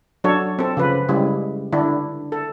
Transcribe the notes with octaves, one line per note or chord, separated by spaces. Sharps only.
F#3 D4 A4 C#5
C4 A4
C#3 F3 B4
C#3 G3 G#3 E4
D3 D4 E4
A4